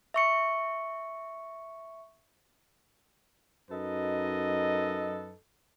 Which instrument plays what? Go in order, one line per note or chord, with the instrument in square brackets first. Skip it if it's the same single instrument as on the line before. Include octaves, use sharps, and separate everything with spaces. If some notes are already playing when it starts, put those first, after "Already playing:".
[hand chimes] E5 C#6 C#7
[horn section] F#2 D#4 A4 B4 D#5